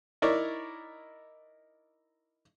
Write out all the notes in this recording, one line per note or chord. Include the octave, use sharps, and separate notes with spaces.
D#4 E4 A#4 C#5 D5